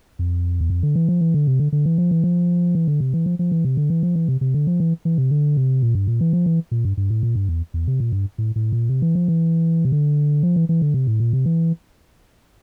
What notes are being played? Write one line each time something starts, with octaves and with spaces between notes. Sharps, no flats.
F2
E2
F2
D3
E3
F3
E3
D3
C3
D3
D3
E3
F3
E3
F3
E3
D3
C3
E3
F3
F3
E3
C3
D3
E3
F3
E3
C3
C3
D3
F3
E3
E3
C3
D3
C3
A#2
G2
A#2
E3
F3
E3
A#2
G2
G2
A2
A#2
G2
E2
E2
C3
A#2
G2
A2
A2
A#2
C3
E3
F3
E3
C3
D3
F3
E3
E3
D3
C3
A2
A#2
C3
E3